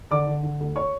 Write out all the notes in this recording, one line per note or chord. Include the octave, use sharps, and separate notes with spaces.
D3 D5 D6
D3
D3
D2
C#5 C#6